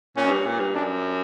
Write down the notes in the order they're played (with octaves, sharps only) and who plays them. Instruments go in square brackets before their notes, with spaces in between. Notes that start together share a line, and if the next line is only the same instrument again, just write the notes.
[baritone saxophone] A#2 [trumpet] C#4
[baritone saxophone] F#2
G2
A#2
G2
[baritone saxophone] F#2 [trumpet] D4